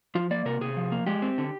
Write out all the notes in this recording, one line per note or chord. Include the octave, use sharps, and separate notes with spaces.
F3 F4
A#3 D5
C3 A#4
C3 G#4
F3
A#3
G#3 G4
C4
D3